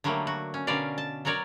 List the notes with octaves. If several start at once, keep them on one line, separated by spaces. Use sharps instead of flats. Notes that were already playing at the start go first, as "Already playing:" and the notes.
D3 F#3 G3 A3 A#3
F#4
C#4
B2 D3 C#4 A#4 D5 F5
A5
F#3 F#4 A#4 C#5 D5